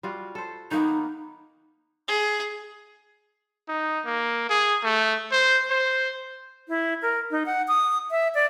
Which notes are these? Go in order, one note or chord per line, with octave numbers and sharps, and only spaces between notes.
G3 F4 F#4
A4 C5
D#3 A#3 B3 D#4
G#4
D#4
A#3
G#4
A3
C5
C5
E4
A#4
D#4
F#5
D#6
E5
D5